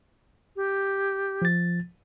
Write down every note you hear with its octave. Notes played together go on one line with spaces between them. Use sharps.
G4
F3 A6